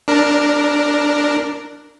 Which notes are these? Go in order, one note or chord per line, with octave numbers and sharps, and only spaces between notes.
D4 A#4